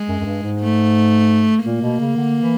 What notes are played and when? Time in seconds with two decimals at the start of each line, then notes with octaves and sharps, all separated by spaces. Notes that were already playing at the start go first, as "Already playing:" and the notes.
Already playing: G#3
0.08 F#2
0.20 F#2
0.25 G2
0.43 G#2
0.60 A3
1.64 A#2 A#3
1.82 B2
2.00 C#3
2.17 D3
2.42 E3